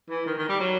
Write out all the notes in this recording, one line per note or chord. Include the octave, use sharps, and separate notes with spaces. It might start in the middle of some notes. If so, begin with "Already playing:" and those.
E3
D#3
D#3
G3
F#3